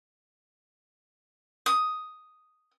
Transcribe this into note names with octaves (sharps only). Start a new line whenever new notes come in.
D#6